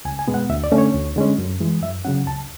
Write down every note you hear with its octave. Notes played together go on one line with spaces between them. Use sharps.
C#2 G#5
G#5
B2 G#3 B3
F#5
D2 E5
D5
D3 A3 C#4
C#5
D2
D3 G#3 C#4
F#2
E3 G#3
F#2 E5
C#3 F#3 C#4 F#5
C#2 A5